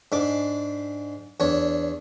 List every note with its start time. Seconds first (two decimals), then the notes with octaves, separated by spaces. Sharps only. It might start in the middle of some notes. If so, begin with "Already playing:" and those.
0.12 G#2 D4 D6
1.40 E2 D4 C#5